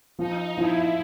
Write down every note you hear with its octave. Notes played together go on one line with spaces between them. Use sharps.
F3 D#4
F3 E4